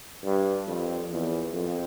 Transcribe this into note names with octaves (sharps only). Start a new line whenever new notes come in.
G2
F2
E2
F2